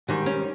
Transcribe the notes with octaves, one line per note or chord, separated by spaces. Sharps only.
G#2 D#3 G3
C#4